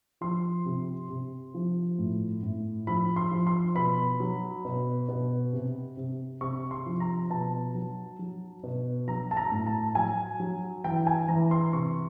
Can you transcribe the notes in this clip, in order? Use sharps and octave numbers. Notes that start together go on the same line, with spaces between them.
F3 C6
C3
C3
F3
A2
A2
F3 B5
C6
F3
C6
B2 B5
F#3
B2
B2
C3
C3
C3 C#6
C6
F3
A#5
B2 A5
F#3
F#3
B2
F#3 A#5
A5
A#5
A2
A5
F#3 G#5
F#3
E3 G5
G#5
E3 A#5
C6
C3 C#6